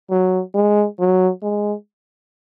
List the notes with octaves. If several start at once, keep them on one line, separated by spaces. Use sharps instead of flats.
F#3
G#3
F#3
G#3